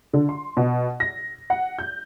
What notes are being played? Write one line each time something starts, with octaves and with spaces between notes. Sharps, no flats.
D3
C6
B2
A#6
F#5
G6